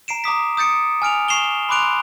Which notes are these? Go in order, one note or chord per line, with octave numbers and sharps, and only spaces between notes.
A#5 C7 D7 E7
A#5 D6 D#6 B6
D#6 G6 A6 C#7 D7
G#5 F6 D7 F7
C#6 C7 E7 F7 G7
B5 C6 D6 F#6 D7 F7